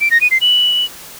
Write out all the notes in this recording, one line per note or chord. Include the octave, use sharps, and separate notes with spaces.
D7
A#6
D#7
C7
F#7